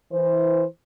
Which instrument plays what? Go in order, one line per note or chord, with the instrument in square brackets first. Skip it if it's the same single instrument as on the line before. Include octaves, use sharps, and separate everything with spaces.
[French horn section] E3 C5